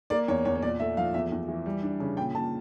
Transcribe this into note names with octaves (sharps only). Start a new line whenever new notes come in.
A#3 D5
E2 C#5
E2 C#5
C#5
A#2 D5
A3 E5
F3 F5
E2 E5
E2
E3
G3
D4
C#3
A#2 G5
A#2 A5